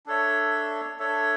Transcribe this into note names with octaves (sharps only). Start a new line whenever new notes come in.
D4 A4 C#5 E5
D4 A4 C#5 E5